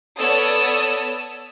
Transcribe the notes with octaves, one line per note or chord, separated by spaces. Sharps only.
B3 A4 C#5 D5 D#6 E6